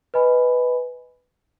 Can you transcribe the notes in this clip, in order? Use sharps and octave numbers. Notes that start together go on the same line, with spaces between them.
B4 D#5 G#5 B5